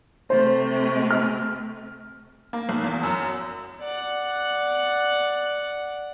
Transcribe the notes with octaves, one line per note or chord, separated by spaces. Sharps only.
C3 A3 C5
F6
A#3
B1
E2
F#2
D5 F#5